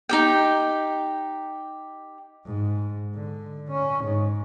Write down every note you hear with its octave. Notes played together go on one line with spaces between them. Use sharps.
D#4 G4 G5
G#2
D3
C#4
G#2